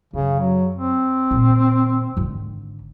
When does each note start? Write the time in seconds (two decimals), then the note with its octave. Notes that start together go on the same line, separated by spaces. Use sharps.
0.13 F#2 C#3
0.40 F#3
0.75 C4
1.31 A#2 D#3
2.17 G#1 D3